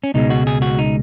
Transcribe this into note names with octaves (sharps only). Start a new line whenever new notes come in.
C#4
C#2 B2 G#3 D#4
F#4
G#4
F#4
D#4